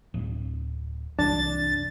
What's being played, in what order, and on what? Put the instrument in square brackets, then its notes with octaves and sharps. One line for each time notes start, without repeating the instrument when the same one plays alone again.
[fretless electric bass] D1
[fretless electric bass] C2 F#2 E3 [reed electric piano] D4 [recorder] A6